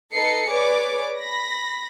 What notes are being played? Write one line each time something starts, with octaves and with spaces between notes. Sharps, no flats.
D#4 A4 B4 D#5 C7 C#7
G#4 B4 C#5 D5 D6
B5 A#6